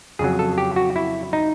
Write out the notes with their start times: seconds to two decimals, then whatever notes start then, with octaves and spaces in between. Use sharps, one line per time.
0.19 F2 C#3 F#3 G#4
0.39 A4
0.58 G4
0.76 F#4
0.96 E4
1.33 D#4